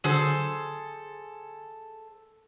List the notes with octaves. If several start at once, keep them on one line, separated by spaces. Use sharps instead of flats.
D3 F#3 G#4 A4 C5